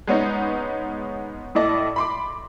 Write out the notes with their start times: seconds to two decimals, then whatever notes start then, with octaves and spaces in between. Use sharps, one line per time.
0.07 G#3 B3 C#4 D#4
1.55 A2 E4 A4 D5 D#5
1.96 B5 C6 D6